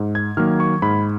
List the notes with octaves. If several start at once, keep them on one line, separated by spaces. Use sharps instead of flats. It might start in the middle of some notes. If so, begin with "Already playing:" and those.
Already playing: G#2
G#6
D#3 F#3 A#3 F6
C#6
G#2 B5